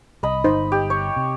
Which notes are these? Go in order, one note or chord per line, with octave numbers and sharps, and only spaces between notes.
C2 D#5 B5
G1 D#4 C5
G4
C#5
C3